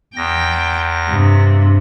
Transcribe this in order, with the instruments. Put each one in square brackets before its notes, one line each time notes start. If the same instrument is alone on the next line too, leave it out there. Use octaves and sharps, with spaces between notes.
[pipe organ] E2 A#6 [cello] G5
[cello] G2 C3